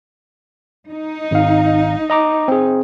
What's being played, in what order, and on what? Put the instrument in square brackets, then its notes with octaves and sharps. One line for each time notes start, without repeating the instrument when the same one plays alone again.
[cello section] D#4
[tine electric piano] G#1 F5
D#5 A#5 D6
C4 G#4